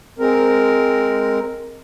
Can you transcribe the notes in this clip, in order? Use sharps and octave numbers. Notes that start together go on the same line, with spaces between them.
G#3 C4 A#4